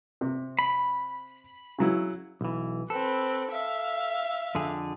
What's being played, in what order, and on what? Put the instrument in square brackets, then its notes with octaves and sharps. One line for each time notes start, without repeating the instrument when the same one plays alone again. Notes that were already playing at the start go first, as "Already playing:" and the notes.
[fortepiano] C3
[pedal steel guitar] B5
[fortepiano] C#3 F#3 E4
[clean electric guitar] B1 E3
[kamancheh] C4 B4 [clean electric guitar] A4
[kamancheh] E5 F5
[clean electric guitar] F2 D3 G#4